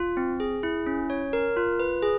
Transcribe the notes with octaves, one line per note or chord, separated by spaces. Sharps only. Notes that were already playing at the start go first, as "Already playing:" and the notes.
Already playing: F4
C4
G#4
E4
C#4
C#5
A#4
F4
B4
G#4